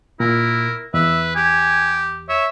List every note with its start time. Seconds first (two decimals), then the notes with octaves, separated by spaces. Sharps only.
0.20 A#2 E4 A#4
0.94 E2 B4 E5
1.36 G4 G#5
2.29 C#5 E5